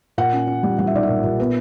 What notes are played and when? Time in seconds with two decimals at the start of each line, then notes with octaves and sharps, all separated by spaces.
0.18 A#2 F#5
0.33 C#4
0.47 C#4
0.63 G3
0.78 G3 F#5
0.87 E5
0.94 B1 D5
1.03 E5
1.09 A#2
1.23 A#2
1.40 B3